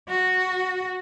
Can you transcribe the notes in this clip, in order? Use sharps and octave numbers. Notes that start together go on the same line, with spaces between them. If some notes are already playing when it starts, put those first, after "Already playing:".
F#4